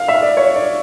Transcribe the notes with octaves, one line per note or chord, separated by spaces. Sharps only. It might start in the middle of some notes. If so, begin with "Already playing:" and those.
Already playing: F5
E5
D5
C#5
D5